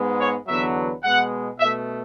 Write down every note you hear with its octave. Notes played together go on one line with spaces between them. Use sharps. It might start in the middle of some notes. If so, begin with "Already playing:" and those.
Already playing: G#2 G#3 B3
C#5
E2 D3 F#3 B3 E5
B2 G#3 B3 F#5
B2 E5
A3